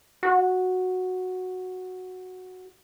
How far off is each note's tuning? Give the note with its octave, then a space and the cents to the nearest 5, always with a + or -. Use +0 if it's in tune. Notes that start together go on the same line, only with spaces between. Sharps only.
F#4 -5